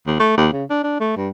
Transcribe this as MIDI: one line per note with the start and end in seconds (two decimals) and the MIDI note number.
0.07 0.15 39
0.20 0.35 57
0.37 0.48 39
0.52 0.65 49
0.70 0.81 62
0.84 0.95 62
1.00 1.12 57
1.17 1.29 43